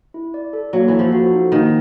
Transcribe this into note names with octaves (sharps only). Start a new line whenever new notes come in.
E4
D5
A4
F#3 A#3
E3 A4
F3
F#4
D#4
D#3 A#3